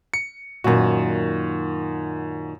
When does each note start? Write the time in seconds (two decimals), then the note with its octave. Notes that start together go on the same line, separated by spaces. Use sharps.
0.14 C#7
0.64 F#2 A#2 D#3 F#4